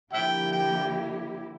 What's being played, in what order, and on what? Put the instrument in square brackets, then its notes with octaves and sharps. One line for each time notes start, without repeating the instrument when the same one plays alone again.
[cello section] D3 F3 A#3 E4 G4 [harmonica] E5 G5
[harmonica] G5